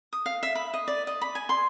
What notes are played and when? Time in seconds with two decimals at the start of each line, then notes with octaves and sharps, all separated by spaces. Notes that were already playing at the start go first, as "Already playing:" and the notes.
0.13 D#6
0.26 F5
0.43 E5
0.55 B5
0.74 D#5
0.88 D5
1.07 D#5
1.21 B5
1.35 G#5
1.49 C6